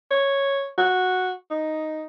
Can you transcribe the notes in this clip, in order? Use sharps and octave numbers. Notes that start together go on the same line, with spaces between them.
C#5
F#4
D#4